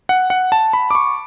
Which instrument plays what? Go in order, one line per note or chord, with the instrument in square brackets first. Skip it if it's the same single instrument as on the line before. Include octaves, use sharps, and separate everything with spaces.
[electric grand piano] F#5
F#5
A5
B5
D6
C#6